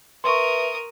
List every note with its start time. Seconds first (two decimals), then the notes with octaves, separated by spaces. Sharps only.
0.24 A#4 B4 E5 C6 C#6 D#6